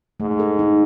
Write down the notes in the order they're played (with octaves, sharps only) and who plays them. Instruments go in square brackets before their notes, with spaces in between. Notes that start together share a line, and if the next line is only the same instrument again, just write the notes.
[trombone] G#2 [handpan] A3
[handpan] A4
D#4